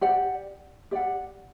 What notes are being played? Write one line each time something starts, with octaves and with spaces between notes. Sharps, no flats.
G4 D5 F#5
G4 D5 F#5